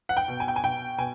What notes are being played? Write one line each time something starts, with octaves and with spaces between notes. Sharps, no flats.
F#5
G5
B2
G#5
G5
G#5
B2 G5
B2 G#5